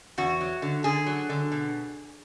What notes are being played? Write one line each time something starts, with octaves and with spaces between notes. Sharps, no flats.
E2 F#4
F#3
D3
D3 G#4
F#3
D3
B2